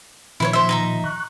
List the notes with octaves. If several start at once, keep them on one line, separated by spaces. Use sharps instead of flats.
A#2 D#3 F3 E4 B4 C#5
C5 E5
D#4 E5 A#5
C#6 F#6